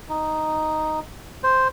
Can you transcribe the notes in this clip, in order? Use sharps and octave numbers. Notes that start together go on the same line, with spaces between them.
D#4
C5